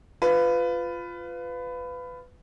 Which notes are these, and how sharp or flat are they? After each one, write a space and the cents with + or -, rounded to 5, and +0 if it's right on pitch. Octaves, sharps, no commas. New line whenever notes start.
F4 +0 B4 +20